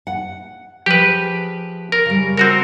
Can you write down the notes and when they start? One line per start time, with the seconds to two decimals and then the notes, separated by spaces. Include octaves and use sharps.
0.07 F#5
0.86 F3 G4 G#4 B4
1.92 A#4
2.06 C#3 G3
2.37 C4 F#4 A#4